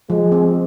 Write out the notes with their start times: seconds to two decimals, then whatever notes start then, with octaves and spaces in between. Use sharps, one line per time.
0.10 F3 G#3
0.32 C4